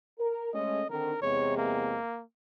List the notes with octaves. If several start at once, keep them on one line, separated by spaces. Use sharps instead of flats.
A#4
G#3 A3 C#4 D#5
D3 D#3 C4 A#4
E2 C3 G#3 C#5
A#3